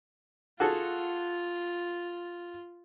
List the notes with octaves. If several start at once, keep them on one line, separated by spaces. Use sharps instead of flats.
F4 F#4 G#4 A4